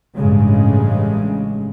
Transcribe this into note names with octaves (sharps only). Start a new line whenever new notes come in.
A1 G2 C#3 G#3